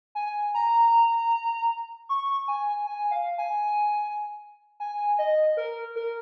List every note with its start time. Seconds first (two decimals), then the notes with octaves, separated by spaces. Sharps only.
0.15 G#5
0.54 A#5
2.09 C#6
2.48 G#5
2.86 G#5
3.11 F5
3.38 G#5
4.80 G#5
5.19 D#5
5.57 A#4
5.96 A#4